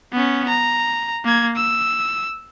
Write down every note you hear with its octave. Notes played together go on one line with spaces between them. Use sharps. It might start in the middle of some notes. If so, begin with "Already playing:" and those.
B3 C#4
A#5
A#3 G#6
E6